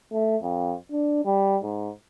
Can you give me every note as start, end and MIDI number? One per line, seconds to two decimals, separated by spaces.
0.12 0.37 57
0.43 0.74 41
0.91 1.21 62
1.25 1.57 55
1.63 1.90 44